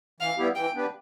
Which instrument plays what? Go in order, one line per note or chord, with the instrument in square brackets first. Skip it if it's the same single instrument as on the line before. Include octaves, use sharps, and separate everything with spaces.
[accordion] E3 [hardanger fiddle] F5
[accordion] G3 B3 E4 G4
[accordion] E3 [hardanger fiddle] G5
[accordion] B3 D4 G4 B4